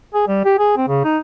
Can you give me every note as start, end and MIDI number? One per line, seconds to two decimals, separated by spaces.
0.14 0.24 68
0.28 0.41 55
0.45 0.55 67
0.59 0.75 68
0.77 0.88 60
0.88 0.99 49
1.04 1.18 63